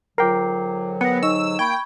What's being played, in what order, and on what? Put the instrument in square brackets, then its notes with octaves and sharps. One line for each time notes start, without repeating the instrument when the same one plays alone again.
[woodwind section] G#2 D3 F#3 [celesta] F4 D6 C7 [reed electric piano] A#4 G5
[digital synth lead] B3 [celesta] A#6 C#7
[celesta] D#4 D#5 C#6 [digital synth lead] E6
[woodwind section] A#3 [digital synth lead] G5 [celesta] B5 C#6 G#6